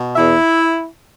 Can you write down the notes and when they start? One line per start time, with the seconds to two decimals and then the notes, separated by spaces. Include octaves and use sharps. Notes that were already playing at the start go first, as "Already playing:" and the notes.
Already playing: B2
0.15 E2 E4 E5